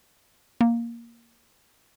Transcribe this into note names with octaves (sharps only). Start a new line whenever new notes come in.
A#3